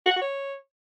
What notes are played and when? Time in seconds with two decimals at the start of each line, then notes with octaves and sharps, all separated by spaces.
0.06 F#4
0.11 F#5
0.16 F#4
0.22 C#5